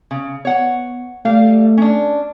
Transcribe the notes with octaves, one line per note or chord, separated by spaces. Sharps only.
C#3
B3 C#5 F#5
G3 A3 F5
C#4 D4